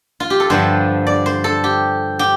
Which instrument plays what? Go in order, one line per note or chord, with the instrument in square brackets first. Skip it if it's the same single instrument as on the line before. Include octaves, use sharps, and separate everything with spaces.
[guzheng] F4
G4
A4
G2 D3 F3 C5
D5
C5
A4
G4
G4